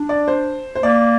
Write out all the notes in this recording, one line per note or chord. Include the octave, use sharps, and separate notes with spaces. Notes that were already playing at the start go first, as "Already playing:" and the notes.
Already playing: D4
D5
C5
C5
A#3 D5